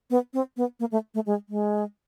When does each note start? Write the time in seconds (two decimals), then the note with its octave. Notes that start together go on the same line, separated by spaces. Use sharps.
0.10 B3
0.34 C4
0.57 B3
0.80 A#3
0.92 A3
1.14 A3
1.26 G#3
1.49 G#3